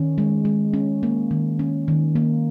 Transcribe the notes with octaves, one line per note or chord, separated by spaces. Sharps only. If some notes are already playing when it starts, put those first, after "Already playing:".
Already playing: D#3 C#4
G#3
G#3
C#4
A#3
D#3
C#4
D#3
A#3